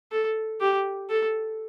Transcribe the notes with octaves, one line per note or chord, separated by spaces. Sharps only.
A4
G4
A4